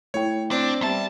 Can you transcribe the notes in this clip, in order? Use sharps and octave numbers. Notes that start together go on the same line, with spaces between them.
A3 E4 C#5 G5
C4 D4 D5
B1 G3 B3 E5 A5